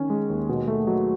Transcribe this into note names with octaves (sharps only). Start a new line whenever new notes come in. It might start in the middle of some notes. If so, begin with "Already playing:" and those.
Already playing: D#3 C#4
G#3
D#2
B2
A3
F#3